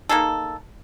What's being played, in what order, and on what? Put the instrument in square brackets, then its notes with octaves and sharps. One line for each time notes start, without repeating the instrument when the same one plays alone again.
[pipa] A#3 D#4 G#4 A4